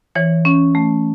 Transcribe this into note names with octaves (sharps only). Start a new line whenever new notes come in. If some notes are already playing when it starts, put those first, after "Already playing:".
E3 C#5
C#4
A3